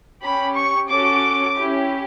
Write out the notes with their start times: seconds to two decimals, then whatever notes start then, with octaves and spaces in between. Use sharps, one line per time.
0.22 C#4 G4 B5
0.56 C#6
0.89 C#4 F#4 A4 D6
1.56 C#4 E4 G4